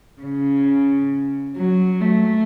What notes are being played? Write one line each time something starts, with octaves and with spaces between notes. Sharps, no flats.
C#3
F#3
A3